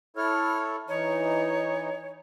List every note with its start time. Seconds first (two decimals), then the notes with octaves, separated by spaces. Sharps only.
0.16 E4 A4 C#5 F6
0.88 E3 D#4 C#5